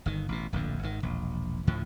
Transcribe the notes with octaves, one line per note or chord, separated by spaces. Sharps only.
G1 D#3
A1 B2
D1 A#1 F2 D3
G#1 D#3
E1 A#1
D2 A2 D3 F3